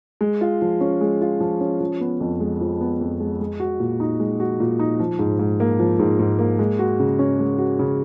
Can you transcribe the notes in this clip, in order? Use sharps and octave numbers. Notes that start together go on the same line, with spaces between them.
G#3
F4
F3
C#4
G#3
F4
F3
C#4
F3
B3
F2
G#3
F3
B3
F2
G#3
G#3
F#4
A#2
D#4
G#3
F#4
A#2
D#4
F3
G#2
G#2
A#3
F3
G#2
G#2
A#3
G#3
F#4
C#3
C#4
G#3
F#4
C#3